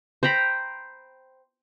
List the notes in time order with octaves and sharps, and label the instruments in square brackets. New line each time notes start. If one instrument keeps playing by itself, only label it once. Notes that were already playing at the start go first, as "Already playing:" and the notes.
[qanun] C5 G5 A#5 B5